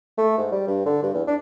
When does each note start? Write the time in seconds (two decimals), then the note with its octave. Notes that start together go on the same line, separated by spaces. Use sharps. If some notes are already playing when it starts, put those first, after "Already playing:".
0.18 A3
0.38 G#2
0.52 G3
0.67 G2
0.86 D3
1.03 G2
1.14 E2
1.27 D4